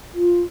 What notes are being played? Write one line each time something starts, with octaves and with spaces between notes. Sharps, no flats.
F4